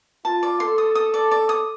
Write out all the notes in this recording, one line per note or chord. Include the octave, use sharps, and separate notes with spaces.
F4 A5
D5
A4 C6
D#6
D#6
D5
D5
D#6